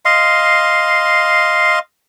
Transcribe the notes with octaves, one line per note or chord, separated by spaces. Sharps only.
D#5 F5 C6